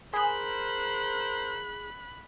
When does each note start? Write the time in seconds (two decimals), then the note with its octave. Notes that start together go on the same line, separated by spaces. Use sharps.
0.14 G#4 A#4 C5 B5 F#6